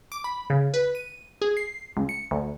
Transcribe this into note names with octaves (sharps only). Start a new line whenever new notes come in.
D6
B5
C#3
B4
D#7
G#4
C7
C#2
C#7
D2